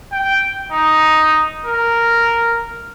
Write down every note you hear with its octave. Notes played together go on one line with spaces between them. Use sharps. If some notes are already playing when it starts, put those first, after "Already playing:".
G5
D#4
A#4